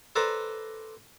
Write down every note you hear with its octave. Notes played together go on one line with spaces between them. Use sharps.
A4 B4 C5 D5 A#5